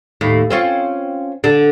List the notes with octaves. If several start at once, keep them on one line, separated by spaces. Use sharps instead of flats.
D#2 A2
C4 C#4 F4
D3